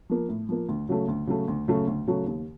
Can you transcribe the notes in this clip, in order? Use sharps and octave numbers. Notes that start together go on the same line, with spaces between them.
F3 A#3
A2
F3 A#3
D2
C#3 F#3 A3
D2
C#3 F#3 A3
D2
C#3 F#3 A3
D2
C#3 F#3 A3
D#2